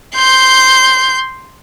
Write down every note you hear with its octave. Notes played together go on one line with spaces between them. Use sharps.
C6 G6